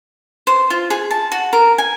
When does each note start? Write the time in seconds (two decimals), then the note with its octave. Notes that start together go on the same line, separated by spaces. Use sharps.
0.47 C5
0.70 F4
0.90 G#4
1.11 A5
1.32 F#4
1.53 A#4
1.78 G#5